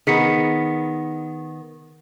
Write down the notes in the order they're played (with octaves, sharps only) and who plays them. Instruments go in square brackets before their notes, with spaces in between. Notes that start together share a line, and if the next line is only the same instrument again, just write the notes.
[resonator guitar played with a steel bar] D#3 B3 [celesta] G#4 B6 C#7